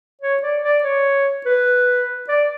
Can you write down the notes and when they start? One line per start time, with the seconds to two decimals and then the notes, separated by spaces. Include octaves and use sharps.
0.21 C#5
0.42 D5
0.63 D5
0.84 C#5
1.46 B4
2.29 D5